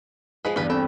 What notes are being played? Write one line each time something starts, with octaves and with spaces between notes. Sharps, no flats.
F3 G#3 G#4 B4
E2 G2 G3 B4
C4 A4 G5 A5 B5